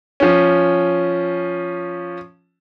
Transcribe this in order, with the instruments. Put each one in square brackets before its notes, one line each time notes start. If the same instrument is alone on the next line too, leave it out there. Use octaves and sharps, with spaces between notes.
[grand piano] F3 C#4